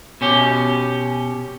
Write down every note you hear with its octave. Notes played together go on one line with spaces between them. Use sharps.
B2 C#4 G4